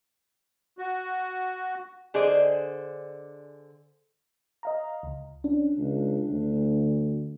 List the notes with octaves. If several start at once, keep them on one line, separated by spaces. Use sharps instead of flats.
F#4
D3 G#4 C5 D5 D#5
D#5 F5 A#5
C#2
C#4 D4
C#2
D2